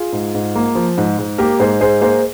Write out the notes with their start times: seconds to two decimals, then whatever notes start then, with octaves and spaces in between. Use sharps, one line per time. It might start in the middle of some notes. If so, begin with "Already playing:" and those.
Already playing: F4 G#4
0.13 G#2
0.35 G#2
0.56 A#3
0.75 F3
0.97 G#2
1.18 G#2
1.38 A#3 G4 A#4
1.59 G#2 G#4 C5
1.81 G#2 G#4 C5
2.01 A#3 G#4 C5